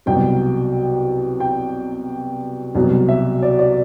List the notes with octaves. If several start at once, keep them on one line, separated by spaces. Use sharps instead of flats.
C2 B2 F#3 G5
G5
C2 B2 F#3
E5
D5
D5